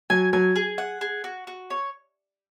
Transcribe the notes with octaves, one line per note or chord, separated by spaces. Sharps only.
F#3 G#5
F#3 G#5
G#4
F#5
G#4
F#4
F#4
C#5